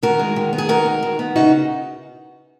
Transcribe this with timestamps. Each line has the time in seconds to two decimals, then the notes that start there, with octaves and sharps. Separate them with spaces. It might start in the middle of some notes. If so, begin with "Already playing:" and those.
0.03 D#3 F#4 A#4
0.19 G#3
0.36 D#3
0.53 B3
0.58 G#4
0.69 D#3 F#4 A#4
0.86 G#3
1.03 D#3
1.19 B3
1.36 C#3 D#4 F#4